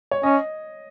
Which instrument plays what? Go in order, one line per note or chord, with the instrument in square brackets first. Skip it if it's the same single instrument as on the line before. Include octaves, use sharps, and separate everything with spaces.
[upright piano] C#5
[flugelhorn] C#4 [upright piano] D#5